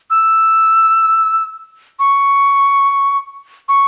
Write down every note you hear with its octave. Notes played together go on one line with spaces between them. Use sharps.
E6
C#6
C#6